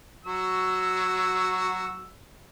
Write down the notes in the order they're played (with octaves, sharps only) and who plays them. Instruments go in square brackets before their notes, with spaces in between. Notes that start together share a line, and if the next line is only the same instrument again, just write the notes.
[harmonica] F#3 F#4 E6